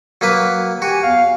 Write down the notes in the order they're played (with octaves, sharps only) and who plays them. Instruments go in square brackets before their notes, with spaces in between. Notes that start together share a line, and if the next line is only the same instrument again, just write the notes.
[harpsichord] F#3 A#3 B4
[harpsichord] F#4 [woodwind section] G4 G#5
[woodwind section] E2 F5